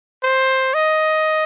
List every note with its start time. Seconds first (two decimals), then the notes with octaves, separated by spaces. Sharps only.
0.23 C5
0.74 D#5